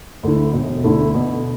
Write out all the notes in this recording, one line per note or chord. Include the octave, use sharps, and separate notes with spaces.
D2 D3 A3 E4
E1
D2 D3 A3 E4
B2